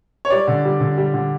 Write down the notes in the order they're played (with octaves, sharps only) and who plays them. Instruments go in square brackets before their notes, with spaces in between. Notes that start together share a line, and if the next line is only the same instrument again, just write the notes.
[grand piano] C#5
G3 D5
D3
G3
D3
G3
D3